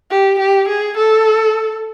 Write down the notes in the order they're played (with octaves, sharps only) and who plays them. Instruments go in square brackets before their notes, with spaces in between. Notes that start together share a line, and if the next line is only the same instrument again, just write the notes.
[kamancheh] G4
G4
G#4
A4